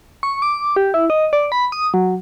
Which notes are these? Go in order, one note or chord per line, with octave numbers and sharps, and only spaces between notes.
C#6
D6
G4
E4
D#5
D5
B5
D#6
F#3